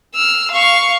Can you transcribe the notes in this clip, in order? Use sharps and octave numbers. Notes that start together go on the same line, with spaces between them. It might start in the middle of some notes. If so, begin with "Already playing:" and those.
E6 F6
F5 C#6